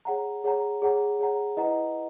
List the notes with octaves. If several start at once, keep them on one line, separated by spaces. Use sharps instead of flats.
G#4 C#5 F#5 A#5
G#4 C#5 F#5 A#5
G#4 C#5 F#5 A#5
G#4 C#5 F#5 A#5
E4 B4 D#5 F#5 A#5